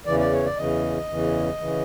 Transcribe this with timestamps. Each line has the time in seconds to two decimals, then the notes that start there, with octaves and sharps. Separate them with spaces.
0.06 E2 C#3 E3 D5
0.19 D5
0.32 C#5
0.45 D5
0.57 E2 C#3 E3 D#5
1.09 E2 C#3 E3
1.60 C#3 E3